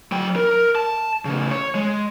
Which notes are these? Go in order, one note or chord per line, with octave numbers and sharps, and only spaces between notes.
F#3 G5
A#4
A5
A2 C#3
C#5
G#3